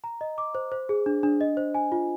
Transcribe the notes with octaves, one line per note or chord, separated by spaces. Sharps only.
A#5
D#5
D6
C5
C5
G#4
D4
D4
D#5
C5
G#5
F4